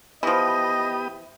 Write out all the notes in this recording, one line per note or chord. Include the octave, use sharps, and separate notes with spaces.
E3 F3 B3 G4 D#5 D#6